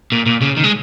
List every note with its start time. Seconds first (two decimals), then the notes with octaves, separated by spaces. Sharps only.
0.12 A#2
0.26 A#2
0.41 C#3
0.57 D#3
0.64 G#3